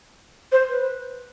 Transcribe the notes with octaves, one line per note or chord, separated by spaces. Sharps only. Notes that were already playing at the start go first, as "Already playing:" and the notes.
C5
B4